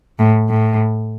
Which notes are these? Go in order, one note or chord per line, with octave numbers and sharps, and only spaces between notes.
A2
A2